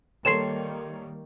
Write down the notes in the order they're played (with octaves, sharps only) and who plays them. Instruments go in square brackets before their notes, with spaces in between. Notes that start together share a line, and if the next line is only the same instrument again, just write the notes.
[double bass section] D#3 G3 A#3 [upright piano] A4 C#5 C6 [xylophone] C7 E7